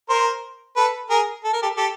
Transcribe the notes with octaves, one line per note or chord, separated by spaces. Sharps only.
A#4 C5
A4 B4
G#4 A#4
A4
A#4
G4 A4
G4 A4